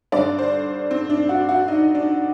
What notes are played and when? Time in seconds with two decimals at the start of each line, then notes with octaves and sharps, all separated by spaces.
0.12 G2 D3 D5
0.39 C5
0.91 C4
1.10 D4
1.29 F#4
1.49 F#4
1.68 D#4
1.95 D4